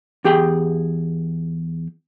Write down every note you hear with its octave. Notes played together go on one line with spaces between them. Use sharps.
E2 G4 G#4 G5